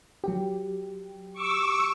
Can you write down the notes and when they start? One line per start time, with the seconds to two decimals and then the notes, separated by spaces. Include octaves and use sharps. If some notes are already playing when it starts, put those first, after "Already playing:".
0.24 F#3 G4
1.33 C#6 D6 E6